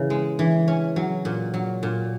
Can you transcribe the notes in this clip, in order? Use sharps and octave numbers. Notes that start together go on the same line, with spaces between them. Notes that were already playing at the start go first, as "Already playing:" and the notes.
Already playing: C#3 E3
G#3
E3
C#4
F#3
A#2
F#3
A#2